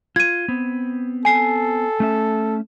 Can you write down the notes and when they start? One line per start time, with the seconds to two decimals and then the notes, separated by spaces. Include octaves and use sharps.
0.16 F4 G#6 D#7
0.48 B3 C4
1.25 A4 G#5 C7
2.00 A3 C#4 E5